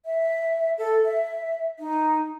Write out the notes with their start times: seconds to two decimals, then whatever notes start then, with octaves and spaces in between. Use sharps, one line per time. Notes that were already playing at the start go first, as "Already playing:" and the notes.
0.05 E5
0.78 A4
1.05 E5
1.79 D#4